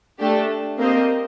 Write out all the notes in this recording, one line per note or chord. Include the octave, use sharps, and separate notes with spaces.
A3 D4 G4 A4
A#3 C4 G4 A#4 C5 D#5